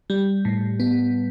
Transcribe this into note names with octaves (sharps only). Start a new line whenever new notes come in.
G3
A2
B3